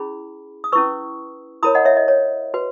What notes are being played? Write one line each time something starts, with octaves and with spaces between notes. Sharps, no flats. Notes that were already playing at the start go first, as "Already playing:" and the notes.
Already playing: C#4 E4 G#4 B5
D#6
C#4 E4 B4 C#6 E6
E4 A#4 C#5 B5 D#6
D#5 F#5
C#5 E5
D#5
C#5
F#4 B4